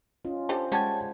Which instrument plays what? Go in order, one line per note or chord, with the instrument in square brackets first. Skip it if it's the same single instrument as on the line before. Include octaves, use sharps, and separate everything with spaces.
[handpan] C#4 F4 D#5
[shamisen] D4 G4 A4 [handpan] C5
[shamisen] G3 C#4 G4 [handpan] G#3 [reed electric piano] F#5 A5 G#6